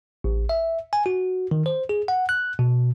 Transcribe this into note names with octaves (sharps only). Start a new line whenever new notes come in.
A1
E5
G#5
F#4
D#3
C5
G#4
F#5
F#6
B2